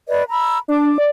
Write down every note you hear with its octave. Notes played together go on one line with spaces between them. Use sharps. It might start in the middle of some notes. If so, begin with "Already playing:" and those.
B4 D5 D#5
A#5 B5 E6
D4 D6
D5